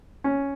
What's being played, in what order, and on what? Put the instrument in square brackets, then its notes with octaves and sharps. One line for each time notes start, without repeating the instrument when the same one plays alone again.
[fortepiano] C#4